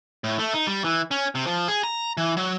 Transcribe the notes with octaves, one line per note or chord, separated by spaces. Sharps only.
A2
A3
D#4
G3
E3
C#4
C3
F3
G#4
A#5
E3
F#3